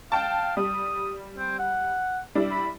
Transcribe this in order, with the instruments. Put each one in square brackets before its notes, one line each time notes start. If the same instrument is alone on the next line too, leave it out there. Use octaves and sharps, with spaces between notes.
[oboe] F5 [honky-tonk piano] G5 A5
[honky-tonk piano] G3 [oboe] D#6
[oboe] C4
F#5
[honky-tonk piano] G3 D4 E4
[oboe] B5